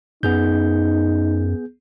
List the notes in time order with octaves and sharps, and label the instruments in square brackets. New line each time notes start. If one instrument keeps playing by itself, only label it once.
[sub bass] F#2 [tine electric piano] B3 G#4 G6 [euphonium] D#4